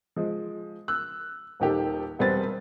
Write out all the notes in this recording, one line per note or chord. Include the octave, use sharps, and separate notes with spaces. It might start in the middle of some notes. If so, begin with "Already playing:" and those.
F3 G#3
E6 F#6
D#1 D#3 G4 A4
E1 G3 C4 B4 A6